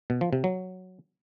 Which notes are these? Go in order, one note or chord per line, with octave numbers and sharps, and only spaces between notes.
B2
F3
C3
F#3